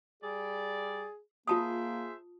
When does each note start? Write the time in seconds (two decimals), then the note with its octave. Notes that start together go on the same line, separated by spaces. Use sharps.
0.23 G3 G#4 D5
1.48 A#3 F4 G#4 C5 E5 A5 D#6